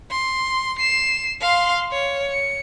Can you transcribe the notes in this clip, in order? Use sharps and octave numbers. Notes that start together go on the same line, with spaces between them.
C6
C7 E7
F5 C6
C#5
C#7